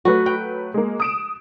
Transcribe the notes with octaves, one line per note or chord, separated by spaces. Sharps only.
F#3 A3 F#4 B4
G5
G#3 A#3
D#6 D7 E7